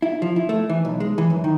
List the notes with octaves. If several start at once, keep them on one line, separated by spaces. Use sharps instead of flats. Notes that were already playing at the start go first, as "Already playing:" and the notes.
E4
F3
E4
A3
E3
B1
G#3
E3
F#2
D#3